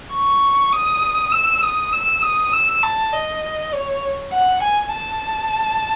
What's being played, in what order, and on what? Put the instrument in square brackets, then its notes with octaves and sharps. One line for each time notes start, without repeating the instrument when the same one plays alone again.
[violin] C#6
D#6
E6
D#6
E6
D#6
E6
A5
D#5
C#5
F#5
G#5
A5